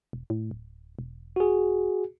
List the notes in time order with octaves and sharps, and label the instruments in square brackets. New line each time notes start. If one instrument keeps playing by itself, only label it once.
[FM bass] E1
A2
D1
E1
[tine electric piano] F#4 G#4